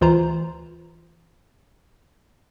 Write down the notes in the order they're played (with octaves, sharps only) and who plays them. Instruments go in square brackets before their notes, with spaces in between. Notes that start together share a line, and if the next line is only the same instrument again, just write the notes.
[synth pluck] D2 E3 F4 C5 A#5